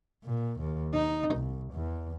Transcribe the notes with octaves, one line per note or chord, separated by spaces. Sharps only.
A#2
D#2
D#4
C2
E2